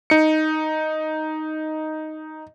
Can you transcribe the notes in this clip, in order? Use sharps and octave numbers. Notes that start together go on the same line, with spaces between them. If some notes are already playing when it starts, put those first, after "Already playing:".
D#4 C#7